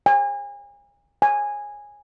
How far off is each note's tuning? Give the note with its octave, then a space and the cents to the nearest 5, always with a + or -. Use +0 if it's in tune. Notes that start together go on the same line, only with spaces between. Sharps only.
G#5 -35
G#5 -5